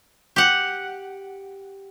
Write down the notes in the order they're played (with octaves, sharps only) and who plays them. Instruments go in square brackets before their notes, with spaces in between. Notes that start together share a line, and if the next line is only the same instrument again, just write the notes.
[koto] G4 F#5